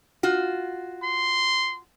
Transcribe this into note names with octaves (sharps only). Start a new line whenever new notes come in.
F4 F#4
C6